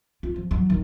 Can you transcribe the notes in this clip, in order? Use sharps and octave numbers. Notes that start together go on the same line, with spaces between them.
F4
F3
E3 F#3
D#3 F#3